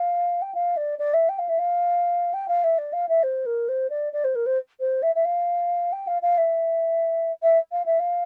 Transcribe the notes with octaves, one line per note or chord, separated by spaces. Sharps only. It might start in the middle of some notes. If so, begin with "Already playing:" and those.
Already playing: F5
G5
F5
D5
D5
E5
G5
F5
E5
F5
G5
F5
E5
D5
F5
E5
C5
A#4
C5
D5
D5
C5
A#4
C5
C5
E5
E5
F5
G5
F5
F5
E5
E5
F5
E5
F5